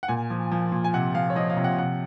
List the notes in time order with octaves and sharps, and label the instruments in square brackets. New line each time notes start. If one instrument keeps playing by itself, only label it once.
[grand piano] F#5
A#2 G#5
F3
F3
A#2
G#5
C3 F#5
F3 F5
C#5
F3 D#5
F5
C3
F#5
C3 F#5